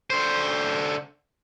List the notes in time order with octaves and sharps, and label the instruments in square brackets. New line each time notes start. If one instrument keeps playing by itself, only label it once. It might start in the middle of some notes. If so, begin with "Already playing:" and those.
[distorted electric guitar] D3 C5